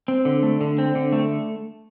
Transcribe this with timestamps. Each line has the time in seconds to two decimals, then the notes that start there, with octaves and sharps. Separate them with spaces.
0.08 C4
0.25 D3
0.43 A3
0.61 D3
0.78 C4
0.95 D3
1.12 A3